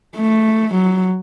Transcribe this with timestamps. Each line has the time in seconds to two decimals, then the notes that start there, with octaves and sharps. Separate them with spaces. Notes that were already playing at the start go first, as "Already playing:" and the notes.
0.16 A3
0.75 F#3